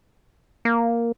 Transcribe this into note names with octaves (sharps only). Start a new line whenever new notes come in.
A#3